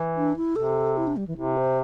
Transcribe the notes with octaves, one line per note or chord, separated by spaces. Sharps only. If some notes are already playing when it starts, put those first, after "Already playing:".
Already playing: E3
D4
E4
C3 A4
E4
D4
G3
E3
C3 E4
C5